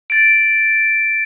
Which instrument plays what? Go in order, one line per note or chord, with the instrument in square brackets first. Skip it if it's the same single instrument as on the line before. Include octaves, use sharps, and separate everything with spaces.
[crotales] A6 D7